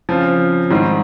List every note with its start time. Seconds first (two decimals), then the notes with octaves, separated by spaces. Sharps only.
0.09 C#3 F3 C4 F4
0.70 G#2 D#3 G3 C4